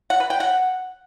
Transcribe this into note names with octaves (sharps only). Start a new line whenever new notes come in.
F#5
B4
G5
F#5